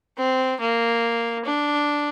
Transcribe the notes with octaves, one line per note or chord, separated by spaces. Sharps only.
C4
A#3
D4